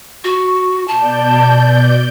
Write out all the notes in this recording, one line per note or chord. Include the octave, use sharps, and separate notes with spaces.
F#4
B2 D5 A5 G6